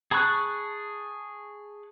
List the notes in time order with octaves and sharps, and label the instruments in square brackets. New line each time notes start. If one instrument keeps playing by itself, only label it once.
[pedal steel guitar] G#4 A5 B5 C#6 F#6